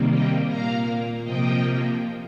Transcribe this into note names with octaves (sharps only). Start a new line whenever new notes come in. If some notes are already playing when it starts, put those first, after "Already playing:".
Already playing: C3 D#3 G3 A#3
D#5 G5
A#2 A#3 F5 A#5
C3 F3 A#3 D#5 G5